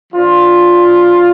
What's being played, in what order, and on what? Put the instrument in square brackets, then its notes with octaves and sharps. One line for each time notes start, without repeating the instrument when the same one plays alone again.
[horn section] F3 D4 F4